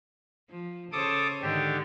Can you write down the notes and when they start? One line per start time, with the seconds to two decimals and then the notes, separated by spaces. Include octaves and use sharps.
0.50 F3
0.92 C#3 A4 C5 C#5 D6 D#6
1.42 G#2 D3 D#3 D4 G4